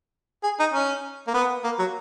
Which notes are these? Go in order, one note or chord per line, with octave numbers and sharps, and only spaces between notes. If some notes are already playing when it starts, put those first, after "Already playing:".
G#4
D#4
C#4
A#3
B3
A#3
F#3